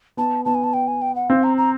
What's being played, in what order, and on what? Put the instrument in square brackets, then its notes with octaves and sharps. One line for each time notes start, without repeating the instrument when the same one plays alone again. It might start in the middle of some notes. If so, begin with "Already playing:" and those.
[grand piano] B3 [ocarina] A5
[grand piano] B3 [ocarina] A5
[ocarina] G#5
A5
G5
G#5
G5
F#5
[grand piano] C4 [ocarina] F5
[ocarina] A#5
A#5